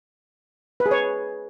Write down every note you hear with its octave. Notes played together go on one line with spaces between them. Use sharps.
B4
G#4
C#5